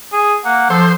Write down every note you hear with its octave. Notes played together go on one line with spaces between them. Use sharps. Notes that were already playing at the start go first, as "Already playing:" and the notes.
G#4
A#3 F#5
F3 A4 C5